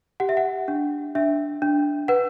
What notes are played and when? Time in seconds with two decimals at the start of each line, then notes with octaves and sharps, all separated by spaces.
0.20 G4 F#5
0.29 E5
0.37 F#5
0.68 D4
1.15 D4 E5
1.62 D4
2.08 B4 F#5